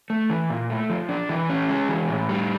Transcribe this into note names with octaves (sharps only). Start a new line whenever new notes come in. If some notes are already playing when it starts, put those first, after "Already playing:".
A3
E3
A#2
A3
F3
D4
E3
C#4
G#3
E3
A2
G3